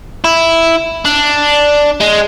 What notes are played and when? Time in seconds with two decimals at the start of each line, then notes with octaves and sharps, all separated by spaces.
0.24 E4
1.05 D4
2.01 G#3